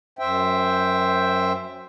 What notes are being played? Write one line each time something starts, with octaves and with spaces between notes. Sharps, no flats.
F#2 C5 E5 G5